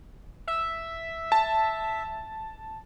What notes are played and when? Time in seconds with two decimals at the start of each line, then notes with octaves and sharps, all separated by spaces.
0.47 E5
1.32 A5